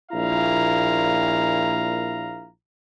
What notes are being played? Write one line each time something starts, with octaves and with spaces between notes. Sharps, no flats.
A#1 A#2 E4 F5 A#5